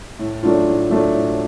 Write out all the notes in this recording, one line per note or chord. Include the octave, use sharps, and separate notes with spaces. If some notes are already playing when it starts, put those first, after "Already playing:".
A2
F#3 A3 D4 F4
A2
F#3 A3 D4 F4
A2